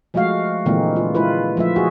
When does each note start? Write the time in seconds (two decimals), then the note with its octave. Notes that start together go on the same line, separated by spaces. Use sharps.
0.14 F3 G#3 A3 F#4 F5
0.66 A#2 D3 E3 G#3 A#3 C4
0.96 F4
1.15 G#3 E4 F4 B4
1.57 F3 A3 F4 E5
1.76 F#4 G#4